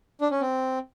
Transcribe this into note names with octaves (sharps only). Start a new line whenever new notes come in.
D4
C#4
C4